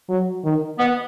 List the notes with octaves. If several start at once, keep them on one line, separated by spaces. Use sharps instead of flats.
F#3
D#3
B3